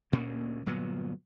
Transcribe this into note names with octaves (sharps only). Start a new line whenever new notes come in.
D2 A#2 A#3 C#4
G1 A#2 F#3 B3